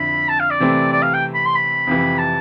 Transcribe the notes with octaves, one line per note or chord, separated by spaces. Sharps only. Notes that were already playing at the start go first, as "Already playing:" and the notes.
Already playing: F2 D3 E4 B5
A5
F5
D5
C3 E3 A3 C4
D5
F5
G5
B5
C6
B5
F2 C3 E3
A5